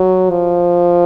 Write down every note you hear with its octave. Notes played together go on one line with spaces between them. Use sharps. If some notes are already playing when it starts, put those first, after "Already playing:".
Already playing: F#3
F3